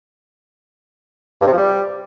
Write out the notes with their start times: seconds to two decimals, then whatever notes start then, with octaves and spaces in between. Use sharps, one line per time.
1.42 G2
1.47 C3
1.52 F3
1.57 G3